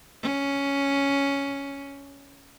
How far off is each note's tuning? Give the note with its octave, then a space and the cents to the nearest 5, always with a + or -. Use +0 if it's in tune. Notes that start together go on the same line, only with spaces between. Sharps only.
C#4 +5